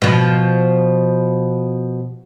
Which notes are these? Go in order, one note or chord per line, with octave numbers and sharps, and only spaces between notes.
B2 F3